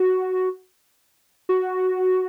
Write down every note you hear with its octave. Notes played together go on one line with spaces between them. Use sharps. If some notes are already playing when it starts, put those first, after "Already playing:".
Already playing: F#4
F#4